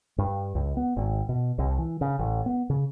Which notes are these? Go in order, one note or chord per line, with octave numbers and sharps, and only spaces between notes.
G2
C#2
B3
G#1
B2
C2
E3
C#3
A1
B3
C#3